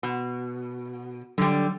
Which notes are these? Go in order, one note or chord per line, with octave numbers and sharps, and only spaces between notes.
B2
D3 F#3 G3